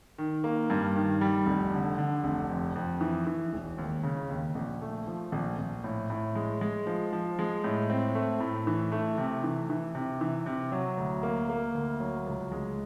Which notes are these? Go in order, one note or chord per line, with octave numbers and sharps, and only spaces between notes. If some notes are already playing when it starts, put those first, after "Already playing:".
D#3
A#3
G2
D#3
G3
F1
D3
D3
F1
F2
F2
E3
E3
E1
D#2
C#3
D#2
A#1
A3
F3
A#1
A#1
A2
A2
G#3
G#3
F3
F3
G#3
A2
C4
A3
A2
E3
A3
C3
E3
E3
C3
E3
C3
F#3
D2
A#3
A#3
D2
F#3
C#2
G#3